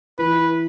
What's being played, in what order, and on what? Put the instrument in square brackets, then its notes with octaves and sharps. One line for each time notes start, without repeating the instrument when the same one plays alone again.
[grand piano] E3 [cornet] B4